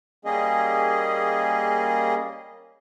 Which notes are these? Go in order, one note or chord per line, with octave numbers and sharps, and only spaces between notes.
G3 A#3 C#4 G#4 D#5